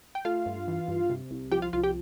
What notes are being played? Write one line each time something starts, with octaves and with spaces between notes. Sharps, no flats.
G5
A3 F4 F5
G2
E3
G2
C3
C2
F3 G4 G5
F4 F5
C2 F4 F5
G4 G5